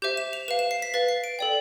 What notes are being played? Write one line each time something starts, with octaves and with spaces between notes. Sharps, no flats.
G4 C5 E5 G6
E7
F7
B4 F5 E7
E7
C7
B6
B4 F5 A6
C7
D7
A4 D5 G5